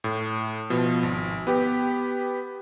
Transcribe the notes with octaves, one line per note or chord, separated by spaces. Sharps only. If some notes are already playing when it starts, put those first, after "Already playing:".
A2
B2 F3
G#1
B3 G4